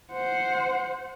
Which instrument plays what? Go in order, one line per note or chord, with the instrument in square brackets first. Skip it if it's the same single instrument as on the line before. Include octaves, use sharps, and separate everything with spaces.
[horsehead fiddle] C5 F#5